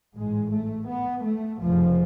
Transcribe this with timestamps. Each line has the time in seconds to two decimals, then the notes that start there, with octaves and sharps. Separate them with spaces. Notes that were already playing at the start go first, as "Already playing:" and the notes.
0.16 A1 G#2 G#3
0.52 A3
0.89 B3
1.25 A3
1.61 F1 F2 C#3 F3